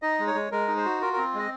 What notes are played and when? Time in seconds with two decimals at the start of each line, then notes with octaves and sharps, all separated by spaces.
0.02 D#4 D#5
0.19 G#3
0.27 C#5
0.35 G#3
0.51 G#3 A#4
0.68 D#4
0.77 C5
0.85 F#4
1.01 F4 A#4
1.13 C4 A#4
1.34 G#3 D#5